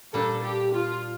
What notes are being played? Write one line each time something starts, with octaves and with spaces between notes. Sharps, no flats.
A#2 G3 D4 A4
G4
F4